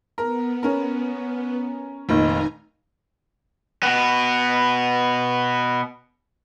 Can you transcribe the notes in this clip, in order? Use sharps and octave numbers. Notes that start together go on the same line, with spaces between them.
B3 A#4
C#4 A#4
F1 A#2 D#3 D#4 G#5 A#5
B2 B3